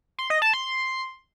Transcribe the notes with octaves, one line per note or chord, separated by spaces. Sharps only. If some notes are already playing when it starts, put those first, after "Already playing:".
C6
D#5
A5
C6